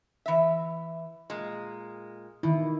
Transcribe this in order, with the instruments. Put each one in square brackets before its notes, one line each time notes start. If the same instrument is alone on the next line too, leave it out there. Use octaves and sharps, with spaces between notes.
[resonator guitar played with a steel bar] E3 E5
A#2 G#3
[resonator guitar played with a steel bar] B2 [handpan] D#3 E4